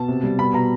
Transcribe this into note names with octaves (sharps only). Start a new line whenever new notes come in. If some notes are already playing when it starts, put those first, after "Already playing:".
Already playing: B2 A5
C3
G3
B2 B5
B2 A#5